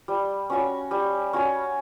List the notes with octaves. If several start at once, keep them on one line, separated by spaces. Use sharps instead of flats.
G3
C#4 F#4 C#5
G3
C#4 F#4 C#5